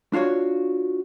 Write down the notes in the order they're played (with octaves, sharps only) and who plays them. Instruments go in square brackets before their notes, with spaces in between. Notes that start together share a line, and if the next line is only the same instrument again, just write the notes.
[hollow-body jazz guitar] D4 F4 F#4 C#5